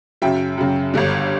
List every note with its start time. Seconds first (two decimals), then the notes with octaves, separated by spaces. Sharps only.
0.22 F#2 C#3 F#3 E5 G5
0.58 F#2 C#3 F#3
0.94 G1 G2 D3